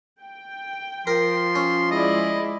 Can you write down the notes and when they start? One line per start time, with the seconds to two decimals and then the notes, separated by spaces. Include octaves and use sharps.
0.21 G5
1.07 F3 A#4 C6
1.55 C#4
1.91 G#3 E4 D5 D#5